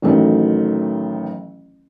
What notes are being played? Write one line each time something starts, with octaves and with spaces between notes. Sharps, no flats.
A1 D#3 F#3 A3